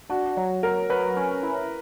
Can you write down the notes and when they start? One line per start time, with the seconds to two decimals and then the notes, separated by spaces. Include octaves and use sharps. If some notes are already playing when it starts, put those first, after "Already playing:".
0.09 D4 F#4
0.37 F#3
0.63 F#3 A#4
0.90 F#3 B4
1.16 C#4
1.43 E4